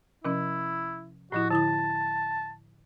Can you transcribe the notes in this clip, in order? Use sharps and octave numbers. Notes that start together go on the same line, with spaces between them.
C3 F3 C#4 E4
A2 F3 E4 F#4
D3 E4 A5 D#6